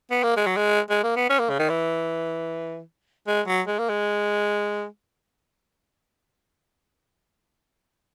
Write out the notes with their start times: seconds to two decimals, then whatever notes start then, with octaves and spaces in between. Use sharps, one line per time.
0.11 B3
0.23 A#3
0.37 G#3
0.47 F#3
0.57 G#3
0.90 G#3
1.03 A#3
1.16 B3
1.30 C#4
1.39 A#3
1.50 C#3
1.59 D#3
1.69 E3
3.27 G#3
3.47 F#3
3.67 G#3
3.79 A#3
3.89 G#3